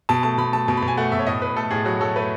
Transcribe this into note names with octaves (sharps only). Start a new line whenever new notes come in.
B2 A5
A3 A5
B2 B5
A3 A5
B2 A5
B5
B2
G#5
A3 F#5
B2 E5
C#5
A2 D#5
A2 B4
A3 A4
A2 G#4
F#3 F#4
F#3 A4
A3 B4